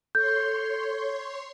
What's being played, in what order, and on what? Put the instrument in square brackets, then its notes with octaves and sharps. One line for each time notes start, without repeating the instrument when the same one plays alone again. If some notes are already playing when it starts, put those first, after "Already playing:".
[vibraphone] A4 [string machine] C#5 C6 [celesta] G6